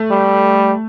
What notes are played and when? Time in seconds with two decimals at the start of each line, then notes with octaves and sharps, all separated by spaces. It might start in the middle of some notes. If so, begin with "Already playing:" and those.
Already playing: A3
0.11 G3